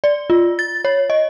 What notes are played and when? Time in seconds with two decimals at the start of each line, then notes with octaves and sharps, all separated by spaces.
0.04 D5
0.30 F4
0.59 A6
0.85 C#5
1.10 D#5